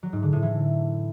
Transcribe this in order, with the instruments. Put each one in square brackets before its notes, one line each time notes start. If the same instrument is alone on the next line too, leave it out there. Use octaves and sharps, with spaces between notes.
[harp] F#3
G#2
D3
A2
E3